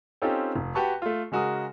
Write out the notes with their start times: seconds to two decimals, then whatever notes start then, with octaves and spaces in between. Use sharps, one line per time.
0.22 C4 C#4 D#4 F4 G4 A4
0.56 F1
0.75 F#4 G4 B4 A5 C#6
1.02 A3 F4
1.32 C#3 G#3 F#4 A#4 D#6